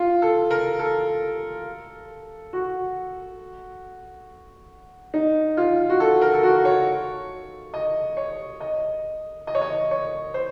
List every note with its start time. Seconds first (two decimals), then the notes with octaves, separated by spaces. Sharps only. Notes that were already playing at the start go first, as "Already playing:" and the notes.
Already playing: F4
0.22 A4
0.50 A#4
0.79 A4
2.53 F#4
5.14 D#4
5.57 F4
5.90 F#4
6.00 A4
6.21 A#4
6.34 A4
6.43 F#4
6.65 C#5
7.74 D#5
8.17 C#5
8.60 D#5
9.47 D#5
9.55 C#5
9.61 D#5
9.91 C#5
10.34 C5